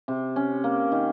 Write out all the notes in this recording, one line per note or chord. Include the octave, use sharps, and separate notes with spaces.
C3
C#4
A#3
D#3